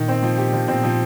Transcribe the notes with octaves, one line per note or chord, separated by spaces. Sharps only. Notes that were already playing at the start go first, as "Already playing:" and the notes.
Already playing: A#2 D#3
C4
F3
G4
F3
A#2 C4
F3